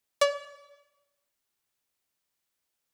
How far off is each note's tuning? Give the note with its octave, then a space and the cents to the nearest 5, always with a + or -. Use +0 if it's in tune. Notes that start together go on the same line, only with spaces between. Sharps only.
D5 -45